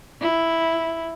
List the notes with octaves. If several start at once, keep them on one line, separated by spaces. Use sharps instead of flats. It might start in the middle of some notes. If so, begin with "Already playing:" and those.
E4